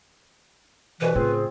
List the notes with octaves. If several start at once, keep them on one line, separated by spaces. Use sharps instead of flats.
C2 B2 E3 B4
A2 C#3 C4 F4 G#4